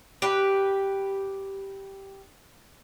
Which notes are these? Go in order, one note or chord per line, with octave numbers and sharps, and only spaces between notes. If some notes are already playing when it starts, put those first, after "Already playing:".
G4 B4